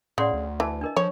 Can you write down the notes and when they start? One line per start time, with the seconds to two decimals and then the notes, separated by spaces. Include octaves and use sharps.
0.18 A2 C#3 D5 F#5 C6
0.33 D2
0.60 E3 A5
0.81 D4 A#4 D#5
0.97 F3 C#5